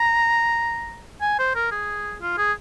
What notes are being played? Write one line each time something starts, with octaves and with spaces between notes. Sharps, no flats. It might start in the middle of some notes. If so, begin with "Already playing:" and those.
Already playing: A#5
G#5
C5
A#4
G#4
F4
G#4